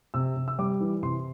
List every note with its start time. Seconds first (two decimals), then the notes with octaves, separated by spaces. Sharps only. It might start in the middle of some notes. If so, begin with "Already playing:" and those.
0.14 C3 E6
0.36 C3
0.48 E6
0.59 G3 D6
0.80 E3
1.03 C3 C6